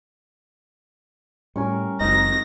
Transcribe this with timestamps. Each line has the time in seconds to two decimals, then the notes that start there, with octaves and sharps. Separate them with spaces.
1.56 A2 G3 C#4 G4 A#4 G#5 C#6
2.00 F#1 F#2 G#3 C4 D#4 D#5 A#6